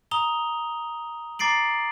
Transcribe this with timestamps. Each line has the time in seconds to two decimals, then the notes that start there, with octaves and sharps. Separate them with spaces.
0.11 A#5 D#6 F7 G7
1.39 A#5 D6 A6 C7 D7 F#7